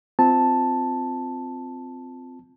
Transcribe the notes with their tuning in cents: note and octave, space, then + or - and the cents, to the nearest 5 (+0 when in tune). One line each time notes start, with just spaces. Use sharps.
C4 -20 F4 +0 A5 +0